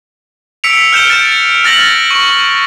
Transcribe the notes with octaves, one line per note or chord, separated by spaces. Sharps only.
E6 B6 C#7 D7 F7
F6 G6 E7 G7
A6 D7 E7
F6 A6 A#6 F#7
C#6